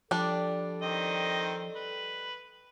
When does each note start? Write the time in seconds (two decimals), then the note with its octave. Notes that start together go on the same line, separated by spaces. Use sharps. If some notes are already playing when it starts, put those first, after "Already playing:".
0.11 F3 G3 D4 A4
0.82 D#3 C4 D#5
1.76 B4